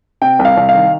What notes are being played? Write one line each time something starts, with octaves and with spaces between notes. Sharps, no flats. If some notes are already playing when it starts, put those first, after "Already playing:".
C3 G5
C2
F5
C2
F5
D#3